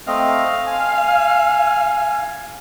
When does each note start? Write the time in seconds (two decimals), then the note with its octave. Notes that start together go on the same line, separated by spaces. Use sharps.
0.07 A3 C4 D#5 F5
0.67 G#5